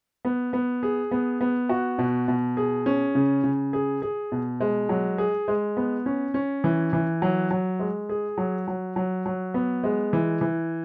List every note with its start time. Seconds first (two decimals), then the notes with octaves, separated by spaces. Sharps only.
0.25 B3
0.53 B3
0.83 G#4
1.11 B3
1.41 B3
1.69 F#4
1.99 B2
2.28 B2
2.57 G#4
2.86 C#4
3.15 C#3
3.44 C#3
3.73 G#4
4.02 G#4
4.32 B2
4.61 G#3
4.89 F#3
5.18 G#4
5.48 G#3
5.77 B3
6.06 C#4
6.34 C#4
6.64 E3
6.93 E3
7.22 F#3
7.51 F#3
7.79 G#3
8.09 G#4
8.38 F#3
8.68 F#3
8.96 F#3
9.26 F#3
9.54 B3
9.84 G#3
10.13 E3
10.41 E3